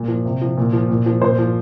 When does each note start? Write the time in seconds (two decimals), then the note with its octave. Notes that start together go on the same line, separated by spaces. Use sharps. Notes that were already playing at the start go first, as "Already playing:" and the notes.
Already playing: A#2
0.08 F3
0.25 C3
0.41 F3
0.57 A#2
0.73 F3
0.89 A#2
1.06 F3
1.22 A#2 C5
1.39 F3